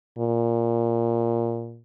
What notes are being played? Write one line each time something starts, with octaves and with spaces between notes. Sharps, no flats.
A#2